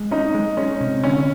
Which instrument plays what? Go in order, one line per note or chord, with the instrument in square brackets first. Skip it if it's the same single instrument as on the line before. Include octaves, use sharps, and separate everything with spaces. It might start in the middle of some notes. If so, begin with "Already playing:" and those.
Already playing: [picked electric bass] G#3
[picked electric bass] C#4 [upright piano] D#4
[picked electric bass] G#3
[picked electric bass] G#3 [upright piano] C#4
[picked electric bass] C3
[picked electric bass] D3 [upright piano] C#4